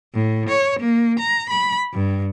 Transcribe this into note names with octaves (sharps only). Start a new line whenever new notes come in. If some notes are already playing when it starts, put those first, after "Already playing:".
A2
C#5
A#3
A#5
B5
G2